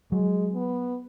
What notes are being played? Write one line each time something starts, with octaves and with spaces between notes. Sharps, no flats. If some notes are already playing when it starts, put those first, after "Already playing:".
F#3 G#3
B3